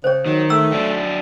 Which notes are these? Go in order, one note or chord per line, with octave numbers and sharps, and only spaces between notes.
C#3 C5 C#5
D#3 F#3
A3 E6
F#3 D4